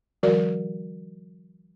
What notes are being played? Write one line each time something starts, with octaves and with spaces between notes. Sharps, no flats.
D#3 F3 G3 F#4 A#4 D5